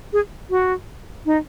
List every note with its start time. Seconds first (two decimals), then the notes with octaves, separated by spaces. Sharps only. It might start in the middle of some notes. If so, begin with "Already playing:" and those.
0.13 G#4
0.50 F#4
1.26 D#4